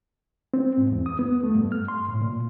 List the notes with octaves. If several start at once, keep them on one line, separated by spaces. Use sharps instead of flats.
C4
G#2
E2
D#6
B3
A3
G2
F6
C6
A2
A#2